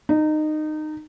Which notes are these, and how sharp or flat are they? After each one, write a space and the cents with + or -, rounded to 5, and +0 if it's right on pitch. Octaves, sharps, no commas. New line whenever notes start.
D#4 -20